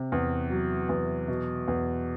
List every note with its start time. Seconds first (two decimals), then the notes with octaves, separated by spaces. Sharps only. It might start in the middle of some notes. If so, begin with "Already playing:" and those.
Already playing: C3
0.12 E2
0.50 F#3
0.89 E2
1.28 B2
1.68 E2